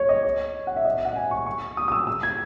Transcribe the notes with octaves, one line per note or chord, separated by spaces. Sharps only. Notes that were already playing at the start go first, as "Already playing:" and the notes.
Already playing: C#5
D#5
C#5
F#5
E5
D#5
E5
F#5
G#5
C#6
C#6
D#6
D#6
E6
E6
G#6